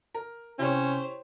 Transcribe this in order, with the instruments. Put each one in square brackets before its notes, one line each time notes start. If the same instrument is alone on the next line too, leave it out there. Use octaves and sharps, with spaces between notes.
[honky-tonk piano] A#4
[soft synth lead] C3 [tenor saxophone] C#4 [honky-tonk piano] E4 G4 C#5 [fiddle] C5